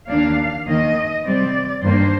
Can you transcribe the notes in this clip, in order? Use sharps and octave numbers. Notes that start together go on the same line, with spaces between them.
D#2 D#3 A#3 D4 F5
D#2 D#3 A#3 D#5
C3 G3 C4 D5
G2 D#3 G3 A#3 D4 C5